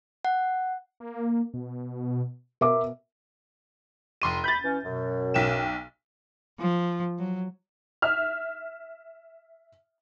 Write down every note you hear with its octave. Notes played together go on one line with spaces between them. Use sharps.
F#5
A#3
B2
B2 A#4 E5 D6
F1 C6 D#7
B5 G6 A6
E3 C#4
F#2 B2
B1 G5 E7
F3
F#3
E5 F6